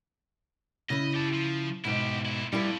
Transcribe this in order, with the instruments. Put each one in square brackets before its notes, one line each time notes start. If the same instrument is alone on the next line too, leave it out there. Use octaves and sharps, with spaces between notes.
[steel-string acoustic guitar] C#3 E4 [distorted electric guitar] D#5
[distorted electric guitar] G4 A5
F3
[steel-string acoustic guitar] G#2 B2 [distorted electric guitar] E4 G4
[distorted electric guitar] A#2 E4
[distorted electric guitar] F2 [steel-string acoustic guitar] G3 E4 B4